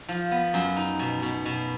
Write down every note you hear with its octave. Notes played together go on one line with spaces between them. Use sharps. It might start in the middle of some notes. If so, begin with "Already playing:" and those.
F3
B3
F#2
D#4
B2
B2
B2